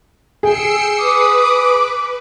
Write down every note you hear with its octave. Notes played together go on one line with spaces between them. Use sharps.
G#4 G5 E6 C7 C#7
B4 D6 D#6